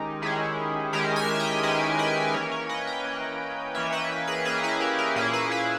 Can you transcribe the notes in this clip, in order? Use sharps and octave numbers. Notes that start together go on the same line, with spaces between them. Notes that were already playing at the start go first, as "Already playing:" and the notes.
Already playing: D#3 G#3 C#4 D#4 G4
D#3 G#3 C#4 E4 G#4
D#3 G#3 C#4 G4 A#4
E5 G#5
D#5 G5
D#3 G#3 C#4 B4 D#5
B4 D#5
E3 A#3 C#4 A#4 C#5
A#4 C#5
B4 D#5
D#5 G5
E3 A#3 C#4
E3 A#3 C#4 C#5 E5
B4 D#5
G#4 B4
E3 A#3 C#4 G#4 B4
E4 G#4
G4 A#4
G4 A#4
A#2 A#3 C#4 E4 G#4
G#4 B4
E4 G#4